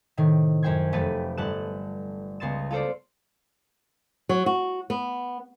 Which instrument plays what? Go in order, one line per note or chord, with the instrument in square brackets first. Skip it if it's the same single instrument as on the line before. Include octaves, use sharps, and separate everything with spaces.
[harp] A2 C3 D#3
F#2 C5 G5 C6 G#6
F1 A3 B4 G5 A6 D#7
G1 B3 A5 F#6 E7
C#2 B3 C6 A6 E7
F4 A4 C5 D5
[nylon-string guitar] F#3
F#4
B3